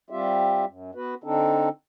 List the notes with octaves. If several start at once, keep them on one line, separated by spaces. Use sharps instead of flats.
G3 C4 F4 G4 E5
F#2
B3 F#4 B4
D3 C4 D4 D#4 A4